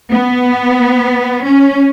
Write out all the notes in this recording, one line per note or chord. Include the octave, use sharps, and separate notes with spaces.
B3
C#4